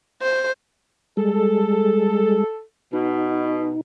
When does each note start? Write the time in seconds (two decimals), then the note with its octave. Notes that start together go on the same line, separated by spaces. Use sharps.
0.22 C5
1.17 G3 G#3 G#4 A4
2.93 B2 D#4